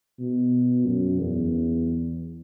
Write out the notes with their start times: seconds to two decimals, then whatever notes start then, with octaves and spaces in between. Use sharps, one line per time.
0.19 B2
0.86 F#2
1.19 E2